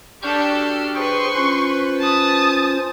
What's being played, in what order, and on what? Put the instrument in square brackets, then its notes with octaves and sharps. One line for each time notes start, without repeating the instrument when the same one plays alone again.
[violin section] D4 G4 A4 [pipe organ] C#6 F6 G6
[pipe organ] F#4 F6
[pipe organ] G#4 C5 G5 [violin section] B4 [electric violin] C6 C#6
[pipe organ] C#4 F4 C5
[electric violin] A5 D#6